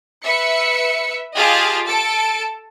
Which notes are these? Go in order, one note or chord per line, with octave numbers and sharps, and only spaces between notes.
B4 E5 C#7
F4 G4 G#4 D#5 F5 A5
A4 A5 D7